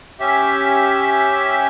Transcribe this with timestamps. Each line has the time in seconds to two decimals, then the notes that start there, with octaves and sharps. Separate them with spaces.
0.20 C#4 G4 E5